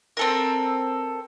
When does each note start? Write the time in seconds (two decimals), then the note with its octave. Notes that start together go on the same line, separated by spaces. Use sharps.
0.17 C4 A4 A#4